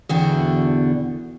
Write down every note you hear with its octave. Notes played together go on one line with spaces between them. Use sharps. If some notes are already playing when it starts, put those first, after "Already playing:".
E2 B2 D3 D4 F#4 G5